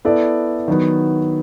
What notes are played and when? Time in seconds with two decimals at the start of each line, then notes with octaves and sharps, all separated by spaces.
0.05 B3 E4 A4 D5
0.68 D#3 F#3 B3